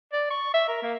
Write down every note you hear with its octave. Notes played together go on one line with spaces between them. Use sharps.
D5
C#6
E5
A#4
A#3